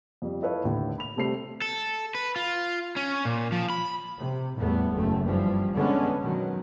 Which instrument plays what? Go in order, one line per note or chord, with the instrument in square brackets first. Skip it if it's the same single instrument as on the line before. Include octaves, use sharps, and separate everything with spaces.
[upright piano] F2 G3
E4 A4 B4 C#5 D#5 F5
D#2 A2 D3
B5 F7
C3 G3 A3 C5 C7 F7
[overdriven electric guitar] A4
B4
F4
C#4
A#2
F3
B5
[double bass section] C3
E2 A2 G3 A3 B3
F#1 E2 C#3 A3
G2 E3 F3
D3 G#3 B3 C#4
B2 D#3 F#3